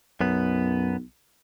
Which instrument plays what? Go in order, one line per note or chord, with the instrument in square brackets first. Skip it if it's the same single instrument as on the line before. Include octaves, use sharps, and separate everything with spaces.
[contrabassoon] B1 [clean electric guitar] F#2 B3